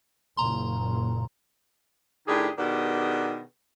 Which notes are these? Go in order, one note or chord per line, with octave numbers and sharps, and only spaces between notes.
F#1 A#2 A#5 C6
A2 D#3 D4 G4 G#4
B2 D#3 B3 D4 G4 G#4